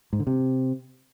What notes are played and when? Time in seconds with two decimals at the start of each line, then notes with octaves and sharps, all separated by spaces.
0.13 G#2
0.20 D3
0.27 C3